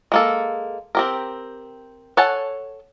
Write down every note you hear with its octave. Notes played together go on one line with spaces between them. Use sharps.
G#3 A#3 A4
C4 G4 A#4
A4 C#5 F#5 G#5 A5